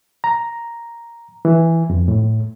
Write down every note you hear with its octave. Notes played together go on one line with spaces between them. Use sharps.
A#5
E3
F2
A2